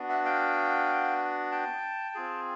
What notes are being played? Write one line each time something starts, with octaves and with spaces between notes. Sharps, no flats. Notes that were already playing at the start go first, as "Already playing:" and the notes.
Already playing: B3 D4 F#4
E5 F#5
F5 G5
G5 A5
C4 F4 G#4